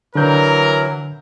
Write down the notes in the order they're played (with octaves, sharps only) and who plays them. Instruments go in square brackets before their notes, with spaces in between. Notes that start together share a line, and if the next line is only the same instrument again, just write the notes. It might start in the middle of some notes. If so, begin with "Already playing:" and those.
[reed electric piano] D3 G6 [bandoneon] E3 F#3 [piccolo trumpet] A#4